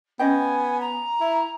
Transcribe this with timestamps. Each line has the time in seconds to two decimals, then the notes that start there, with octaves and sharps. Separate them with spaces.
0.19 B3 C#4 D#5 G5 G#5
0.80 A#5
1.20 E4